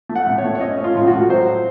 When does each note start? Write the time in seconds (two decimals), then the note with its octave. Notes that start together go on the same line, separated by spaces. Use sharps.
0.09 A3
0.15 F#5
0.27 A2
0.38 C#5
0.44 A3
0.55 C#5
0.60 C#4 D#5
0.78 C#4
0.84 F4
0.95 A2 F4
1.07 F#4
1.13 A2
1.30 F#3 C5